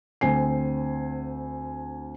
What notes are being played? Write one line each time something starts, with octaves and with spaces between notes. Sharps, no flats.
D2 C4 G#5 C7